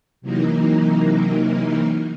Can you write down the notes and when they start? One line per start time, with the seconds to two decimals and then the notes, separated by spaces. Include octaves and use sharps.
0.21 C3 E3 F#3 A#3 D#4 A#4